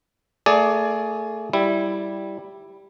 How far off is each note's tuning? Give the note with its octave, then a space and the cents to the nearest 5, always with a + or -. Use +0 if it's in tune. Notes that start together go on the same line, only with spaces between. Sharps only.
A3 +30 G#4 +20 D5 +0
G3 +0 E4 +0